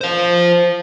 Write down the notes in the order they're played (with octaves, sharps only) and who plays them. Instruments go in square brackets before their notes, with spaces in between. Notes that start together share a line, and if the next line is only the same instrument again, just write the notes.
[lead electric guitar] C5 F5